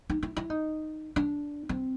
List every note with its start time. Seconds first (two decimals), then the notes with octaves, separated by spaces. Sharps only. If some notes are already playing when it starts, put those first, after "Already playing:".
0.10 D#4
0.23 E4
0.37 E4
0.50 D#4
1.16 D4
1.69 C4